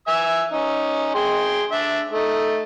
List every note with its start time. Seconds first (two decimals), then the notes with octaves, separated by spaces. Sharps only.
0.08 E5 G#5 E6
0.52 C#4 D#4
1.15 G#4 G5 C6
1.71 D4 E5
2.11 A3 D#4